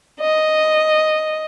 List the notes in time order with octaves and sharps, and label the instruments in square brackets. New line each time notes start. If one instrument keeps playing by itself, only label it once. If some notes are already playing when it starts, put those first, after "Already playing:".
[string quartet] D#5